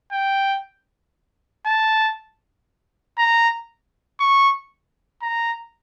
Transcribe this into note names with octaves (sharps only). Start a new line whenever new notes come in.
G5
A5
A#5
C#6
A#5